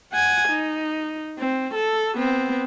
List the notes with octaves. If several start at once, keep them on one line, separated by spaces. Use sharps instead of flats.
F#5 G#5
D#4
C4
A4
B3 C4